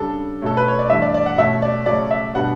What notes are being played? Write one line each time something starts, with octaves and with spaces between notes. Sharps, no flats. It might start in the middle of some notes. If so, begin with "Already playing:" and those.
Already playing: C#3 G3 D4 A4
B2 A3 C#4 A4
B4
C#5
D5
G2 E3 A3 E5
D5
D5
F#5
B2 A3 C#4 E5
D5
C#3 F#3 A3 C#4 D5
E5
B2 G3 B3 D4 F#5